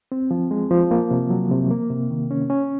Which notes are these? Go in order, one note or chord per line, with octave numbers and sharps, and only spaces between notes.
C4
F3
G#3
F3
A#3
C3
F#3
C3
A#3
C3
D#3
C#4
C#4